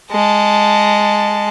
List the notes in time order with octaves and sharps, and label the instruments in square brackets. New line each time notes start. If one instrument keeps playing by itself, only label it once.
[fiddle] G#3 A5